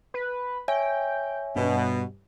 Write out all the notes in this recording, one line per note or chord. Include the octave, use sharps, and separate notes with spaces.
B4
C#5 E5 G5 G#5
G2 B2